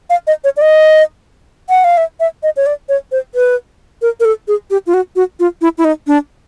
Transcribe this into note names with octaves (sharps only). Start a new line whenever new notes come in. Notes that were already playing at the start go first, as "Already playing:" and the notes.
F5
D#5
C#5
D5
D#5
F#5
F5
E5
E5
D#5
C#5
D5
C#5
C5
B4
A#4
A#4
A4
G#4
G4
F4
F#4
F#4
F4
E4
E4
D#4
D4